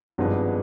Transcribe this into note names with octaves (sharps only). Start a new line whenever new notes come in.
G#1 G2 F3 G#3 B3